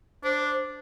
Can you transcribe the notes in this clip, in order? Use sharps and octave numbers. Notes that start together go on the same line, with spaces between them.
D4 C5